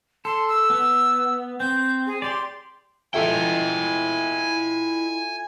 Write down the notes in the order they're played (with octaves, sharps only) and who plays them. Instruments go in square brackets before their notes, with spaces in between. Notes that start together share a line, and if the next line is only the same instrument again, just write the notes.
[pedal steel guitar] A4 [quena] C6
[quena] E6
[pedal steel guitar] B3
[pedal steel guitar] C4 [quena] G6
[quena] G#4
[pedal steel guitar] G4 D5 [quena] C6
[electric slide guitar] E4 D#5 G5 [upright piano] F4 A4 E5 [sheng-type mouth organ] G#5